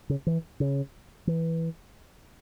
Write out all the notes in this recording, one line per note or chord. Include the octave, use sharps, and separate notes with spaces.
C#3
E3
C#3
E3